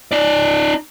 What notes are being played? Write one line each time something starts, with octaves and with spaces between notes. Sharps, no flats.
D#4 D5